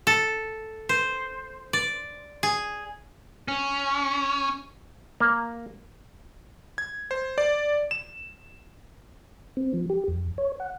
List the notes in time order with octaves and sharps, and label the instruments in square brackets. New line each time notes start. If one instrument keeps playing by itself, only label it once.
[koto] A4
C5
D5
G#4
[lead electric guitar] C#4
[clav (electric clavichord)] A#3
[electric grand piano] G#6
C5
D5
E7
[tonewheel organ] C4
F3
G4
F2
C#5
F#5